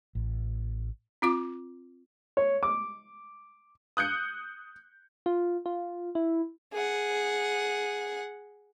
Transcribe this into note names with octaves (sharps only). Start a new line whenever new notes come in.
A1
C4 F4 D6
C#5
D6
D#6 F#6 G6 C#7
F4
F4
E4
G#4 F#5